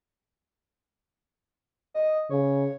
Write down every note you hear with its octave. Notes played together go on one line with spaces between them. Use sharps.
D#5
C#3 C#5